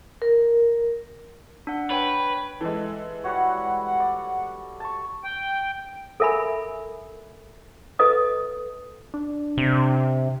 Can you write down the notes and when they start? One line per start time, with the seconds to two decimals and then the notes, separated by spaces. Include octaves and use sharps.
0.22 A#4
1.67 D4 F#5
1.91 B4 C#5 G5
2.61 E3 G#3 A4 E5
3.24 G3 F#4 C#5 F#5
3.67 B5
4.00 D5
4.80 A5 C#6
5.24 G5
6.20 A4 A#4 E5 G#5 B5
7.99 A4 B4 D#5 D#6
9.14 D4
9.57 C3